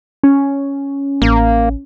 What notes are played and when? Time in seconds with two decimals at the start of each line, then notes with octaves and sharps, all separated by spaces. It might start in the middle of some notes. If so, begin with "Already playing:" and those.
0.23 C#4
1.22 A1 A#3